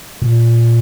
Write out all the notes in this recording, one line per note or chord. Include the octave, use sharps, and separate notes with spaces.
A#2